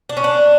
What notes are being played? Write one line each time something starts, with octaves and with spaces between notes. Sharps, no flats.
D4
C#4
D4